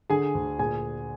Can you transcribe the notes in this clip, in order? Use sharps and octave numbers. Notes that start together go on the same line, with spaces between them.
D3 G#4 G#5
D2
A#2 G#4 G#5